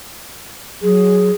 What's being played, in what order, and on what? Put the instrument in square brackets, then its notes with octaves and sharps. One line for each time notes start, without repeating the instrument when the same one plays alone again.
[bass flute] F#3 [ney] G#4